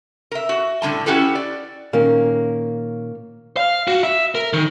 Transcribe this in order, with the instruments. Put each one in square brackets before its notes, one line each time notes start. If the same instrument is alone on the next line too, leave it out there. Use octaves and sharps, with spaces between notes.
[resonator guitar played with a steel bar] A#4 E5
F#4
A2 D3 G3 A5
C#4 E4 F#4 G4 A4 B4
D5
[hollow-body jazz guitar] A#2 D#3 C#4 [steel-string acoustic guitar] A#3
[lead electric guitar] F5
F#4
E5
A#4
D#3